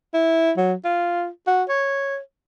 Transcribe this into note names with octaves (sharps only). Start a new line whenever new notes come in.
E4
F#3
F4
F#4
C#5